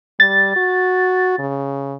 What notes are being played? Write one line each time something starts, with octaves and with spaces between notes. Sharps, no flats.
G3 A6
F#4
C#3